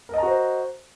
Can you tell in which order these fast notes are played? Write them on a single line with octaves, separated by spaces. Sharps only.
A#4 D#5 A#5 F#4 C5